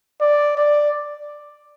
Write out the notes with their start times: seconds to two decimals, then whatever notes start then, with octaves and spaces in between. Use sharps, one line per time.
0.21 D5
0.57 D5